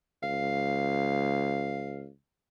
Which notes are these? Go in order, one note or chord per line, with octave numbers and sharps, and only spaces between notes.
C#2 F5